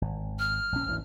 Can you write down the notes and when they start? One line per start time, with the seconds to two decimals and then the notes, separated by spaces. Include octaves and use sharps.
0.02 G#1
0.39 F6
0.72 A#1 C#4
0.87 G#1 D2 E3